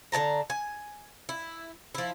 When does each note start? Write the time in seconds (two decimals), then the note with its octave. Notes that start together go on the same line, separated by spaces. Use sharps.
0.12 D3 D5 A5 A#5
0.50 G#5
1.29 E4
1.95 F3 E4